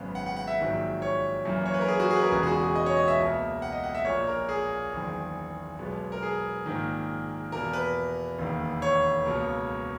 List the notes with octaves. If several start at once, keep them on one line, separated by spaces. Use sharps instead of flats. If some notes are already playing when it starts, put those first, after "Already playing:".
Already playing: G#1 F#2 C#3 G#3 B3
F#5
F#5
F#5
E5
A#1 G#2 D#3 F#3
C#5
F#2 E3 A#3
C#5
B4
A#4
G#4
F#4
G#4
B4
A#4
E1 E2 C#3 G#3 B3 G#4
G#4
F#4
G#4
D#5
C#5
D#5
E5
C#2 B2 A#3
F#5
D#5
F#5
E5
A#1 A#2 A#3 C#5
A#4
G#4
F#1 E2 D#3
B1 B2 G#3 B3
A#4
G#4
A#1 G#2 D#3 A#3
E2 B2 A#3 A#4
B4
E1 D#2 D#3
C#5
C#2 B2 A#3